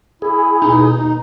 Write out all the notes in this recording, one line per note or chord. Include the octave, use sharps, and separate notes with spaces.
E4 G#4
D#2 B2 D#4